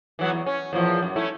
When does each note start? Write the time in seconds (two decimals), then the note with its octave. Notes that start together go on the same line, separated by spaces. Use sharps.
0.19 E3 F#3 B3
0.31 E2
0.46 C#4
0.73 E2 A#2 F3
1.03 F#2
1.16 A3 C#4 E4